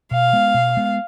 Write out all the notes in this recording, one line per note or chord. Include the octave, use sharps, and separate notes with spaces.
B2 F5
G#3 B3
B2
G#3 B3